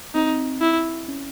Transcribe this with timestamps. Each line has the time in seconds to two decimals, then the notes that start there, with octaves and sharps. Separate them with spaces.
0.14 C4 D#4
0.61 E4
1.08 C#4